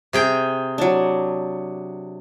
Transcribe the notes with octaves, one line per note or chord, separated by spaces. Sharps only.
C3 G#4 G5
F#3 D4